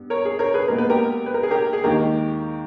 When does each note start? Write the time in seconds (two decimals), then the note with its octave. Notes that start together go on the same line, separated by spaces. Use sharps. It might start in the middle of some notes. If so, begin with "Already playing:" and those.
Already playing: G2 B3
0.10 A#4 C#5
0.25 G#4
0.39 A#4 C#5
0.54 G#4 B4
0.68 A#2 G#3 B3 A#4
0.78 B4
0.90 G4 A#4
1.26 B4
1.34 A#4
1.43 G#4
1.51 G4 A#4
1.73 G#4
1.84 D#2 D#3 G#3 G4 A#4